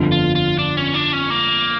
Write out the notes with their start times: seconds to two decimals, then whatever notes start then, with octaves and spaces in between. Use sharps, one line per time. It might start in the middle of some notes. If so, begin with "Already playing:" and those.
Already playing: G1 F2 D3
0.12 F4
0.35 F4
0.59 D4
0.77 C#4
0.94 D4
1.13 C#4
1.30 A#3